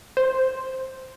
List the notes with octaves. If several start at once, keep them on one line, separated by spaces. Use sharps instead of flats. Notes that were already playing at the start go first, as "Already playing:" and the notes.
C5